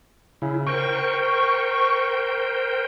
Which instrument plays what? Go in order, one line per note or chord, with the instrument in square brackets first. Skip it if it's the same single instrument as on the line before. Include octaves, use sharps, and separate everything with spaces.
[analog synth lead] C#3 [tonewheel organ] E4
[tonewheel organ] A#4 C5 G5 [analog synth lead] C#6